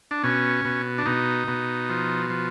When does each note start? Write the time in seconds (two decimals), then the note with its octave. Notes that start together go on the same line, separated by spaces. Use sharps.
0.11 D4
0.24 B2 C#4
0.65 B2
0.98 D4
1.06 B2 D#4
1.48 B2
1.90 F3
2.30 F3